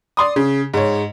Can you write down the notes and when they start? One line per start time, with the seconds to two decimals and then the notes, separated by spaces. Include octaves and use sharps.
0.17 D5 C6 D#6
0.36 C#3
0.74 G#2 C#5